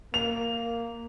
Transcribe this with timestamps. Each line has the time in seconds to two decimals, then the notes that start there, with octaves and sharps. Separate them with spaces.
0.14 A#3 F7